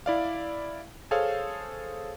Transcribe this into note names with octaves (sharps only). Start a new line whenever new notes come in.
E4 D5 F5
G#4 A4 C5 C#5 F5